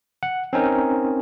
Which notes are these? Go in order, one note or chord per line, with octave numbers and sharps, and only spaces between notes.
F#5
C4 C#4 D#4 A#4